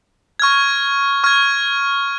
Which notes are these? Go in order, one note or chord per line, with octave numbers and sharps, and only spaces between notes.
C#6 F6 G#6
C#6 F6 G#6